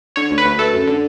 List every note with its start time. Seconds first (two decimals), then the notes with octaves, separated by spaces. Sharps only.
0.16 D3 C#5
0.31 D2
0.38 B4
0.45 D2
0.59 A3 A4
0.73 F#2
0.87 D3